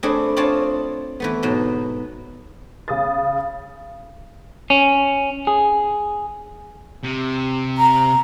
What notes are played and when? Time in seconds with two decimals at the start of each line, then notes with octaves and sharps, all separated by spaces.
0.03 A3 C4 D4 E4 G#4 A4
0.37 C4 D4 F4 C#5 A5
1.20 E3 A3 B3
1.43 G#2 B2 F#3
2.88 C#3 D#6 A6
4.70 C#4
5.47 G#4
7.03 C3
7.78 A#5